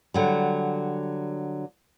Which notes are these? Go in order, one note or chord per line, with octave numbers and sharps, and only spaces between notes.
D3 F#3 G3